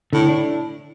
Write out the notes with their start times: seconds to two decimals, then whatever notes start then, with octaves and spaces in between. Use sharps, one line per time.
0.13 A2 D3
0.28 D4